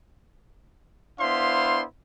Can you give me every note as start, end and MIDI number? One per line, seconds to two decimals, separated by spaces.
1.20 1.83 59
1.20 1.83 62
1.20 1.83 64
1.20 1.83 72
1.20 1.83 77
1.20 1.83 84